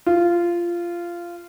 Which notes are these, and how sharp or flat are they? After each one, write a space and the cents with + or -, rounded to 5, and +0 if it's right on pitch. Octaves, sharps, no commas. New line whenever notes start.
F4 -15